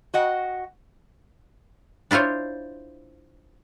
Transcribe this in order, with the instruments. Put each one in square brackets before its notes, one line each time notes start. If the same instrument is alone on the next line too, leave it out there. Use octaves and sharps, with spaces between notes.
[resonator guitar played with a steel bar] F#4 D#5 F#5 G5
[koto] D4 E4 F4 C5 C#5